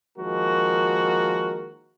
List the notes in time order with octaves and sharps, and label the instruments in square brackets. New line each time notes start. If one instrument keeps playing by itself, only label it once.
[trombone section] D#3 F3 G#3 A#3 F#4 A#4